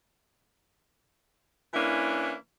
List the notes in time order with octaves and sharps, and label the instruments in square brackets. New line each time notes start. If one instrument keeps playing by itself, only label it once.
[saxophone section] E3 A#3 C#4 D4 E4